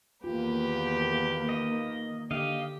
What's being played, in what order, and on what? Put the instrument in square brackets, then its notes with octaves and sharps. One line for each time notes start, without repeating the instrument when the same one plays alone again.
[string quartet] E2 G4 B4 [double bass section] D#3 A#3 [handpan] F4
[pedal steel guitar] D#5
[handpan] D3 [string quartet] G4 [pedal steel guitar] D#5 F5